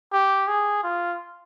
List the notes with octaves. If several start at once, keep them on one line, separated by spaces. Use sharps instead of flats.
G4
G#4
F4